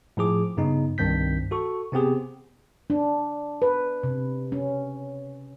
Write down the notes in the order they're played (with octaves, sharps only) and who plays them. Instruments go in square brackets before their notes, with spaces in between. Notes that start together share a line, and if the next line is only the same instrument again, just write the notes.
[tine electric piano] A2 F3 G#4 D6
G2 C#3 B3 D#4
C2 G2 D#3 C4 G6 B6
F#4 A4 C#6
C3 B3 C4 G4 G#4
[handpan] D4
B4
C3
C#4